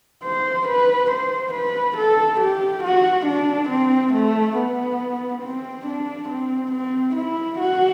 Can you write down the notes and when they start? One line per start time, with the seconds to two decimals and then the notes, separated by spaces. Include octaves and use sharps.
0.23 C5
0.67 B4
1.11 C5
1.54 B4
1.97 A4
2.40 G4
2.83 F#4
3.27 D4
3.69 C4
4.13 A3
4.56 B3
5.42 C4
5.86 D4
6.29 C4
6.72 C4
7.15 E4
7.59 F#4